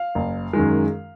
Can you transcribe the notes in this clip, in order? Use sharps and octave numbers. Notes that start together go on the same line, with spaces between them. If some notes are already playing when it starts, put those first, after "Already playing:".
Already playing: F5
F#1
F#2 D#3 G#3